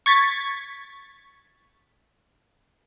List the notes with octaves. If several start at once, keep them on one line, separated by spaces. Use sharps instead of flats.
C#6 G#6 A6 B6